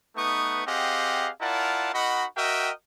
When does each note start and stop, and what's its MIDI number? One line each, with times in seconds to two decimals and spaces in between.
0.16 0.63 57
0.16 0.63 59
0.16 0.63 63
0.16 0.63 71
0.16 0.63 85
0.16 0.63 87
0.66 1.29 60
0.66 1.29 67
0.66 1.29 68
0.66 1.29 75
0.66 1.29 77
0.66 1.29 78
1.40 1.90 64
1.40 1.90 65
1.40 1.90 70
1.40 1.90 74
1.40 1.90 78
1.40 1.90 81
1.94 2.25 63
1.94 2.25 66
1.94 2.25 70
1.94 2.25 75
1.94 2.25 78
1.94 2.25 83
2.37 2.70 66
2.37 2.70 70
2.37 2.70 75
2.37 2.70 76
2.37 2.70 79